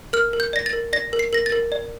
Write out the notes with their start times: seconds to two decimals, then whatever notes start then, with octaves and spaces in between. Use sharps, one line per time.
0.13 A#4 F6
0.33 A#4
0.40 G6
0.53 D5 A#6
0.66 A6
0.73 A#4
0.93 D5 A#6
1.13 A#4
1.19 C7
1.33 A#4 A#6
1.46 A6
1.52 A#4
1.72 D5